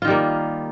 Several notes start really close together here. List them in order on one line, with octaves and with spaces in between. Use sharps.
F4 D#3 G3 A#3